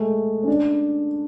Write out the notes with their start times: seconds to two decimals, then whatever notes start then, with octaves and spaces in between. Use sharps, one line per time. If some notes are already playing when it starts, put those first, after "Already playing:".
Already playing: G#3 A3
0.43 C#4
0.47 D4